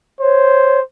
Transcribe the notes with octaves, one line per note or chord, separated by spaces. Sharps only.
C5 C#5